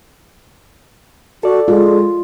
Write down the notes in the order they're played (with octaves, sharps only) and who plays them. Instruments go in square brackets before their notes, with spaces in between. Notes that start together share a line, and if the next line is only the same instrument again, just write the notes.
[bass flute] F#4 [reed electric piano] A4 D5
[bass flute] G#3 [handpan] F4